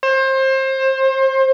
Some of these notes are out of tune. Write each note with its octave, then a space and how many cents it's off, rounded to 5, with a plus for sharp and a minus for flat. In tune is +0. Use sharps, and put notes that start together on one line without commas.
C5 +25